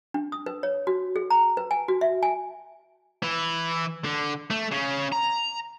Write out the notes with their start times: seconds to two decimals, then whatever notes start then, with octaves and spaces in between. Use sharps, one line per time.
0.14 D4
0.32 D#6
0.46 B4
0.63 C#5
0.87 F#4
1.16 G#4
1.30 A#5
1.57 B4
1.71 G#5
1.88 F#4
2.01 E5
2.23 G#5
3.22 E3 E4
4.05 D3
4.50 A3
4.71 C#3 C#4
5.12 A#5